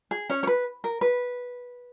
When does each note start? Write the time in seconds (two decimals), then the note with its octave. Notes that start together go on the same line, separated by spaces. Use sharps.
0.11 G#4
0.29 C#4 C#5
0.43 C#5
0.47 B4
0.84 A#4
1.01 B4